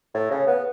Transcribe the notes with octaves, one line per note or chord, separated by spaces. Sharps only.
A2
C#3
B3